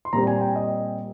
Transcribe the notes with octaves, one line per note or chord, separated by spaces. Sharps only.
C6
A#2 G3 C4 A#5
G#5
G5
D#5